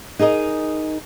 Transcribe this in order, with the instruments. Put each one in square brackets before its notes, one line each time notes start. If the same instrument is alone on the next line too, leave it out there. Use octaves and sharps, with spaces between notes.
[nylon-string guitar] D#4 G#4 A#4 D#5